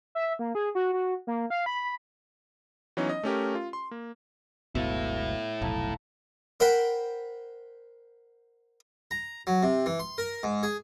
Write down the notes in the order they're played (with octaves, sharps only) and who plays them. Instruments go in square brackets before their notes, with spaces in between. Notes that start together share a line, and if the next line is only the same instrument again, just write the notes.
[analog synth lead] E5
A#3
G#4
F#4
F#4
A#3
F5
B5
[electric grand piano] E3 F#3 B3 C#4 D#4
D#5
A3 C#4 G4 A#4
F4
C6
A#3
[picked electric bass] F#1 C#2 B2 [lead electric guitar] A3 E4 [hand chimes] B3 F5
[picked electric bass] F1 B1 [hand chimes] F5 A5 A#5
[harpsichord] A#4 C5 F#5 G5 B5
A#5
F#3
C3
E3
C6
A#4
G#2
G#4